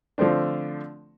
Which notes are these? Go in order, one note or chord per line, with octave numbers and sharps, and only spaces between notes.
D3 F3 A3 C4 D4